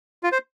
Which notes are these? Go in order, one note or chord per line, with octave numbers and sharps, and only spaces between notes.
F4
C5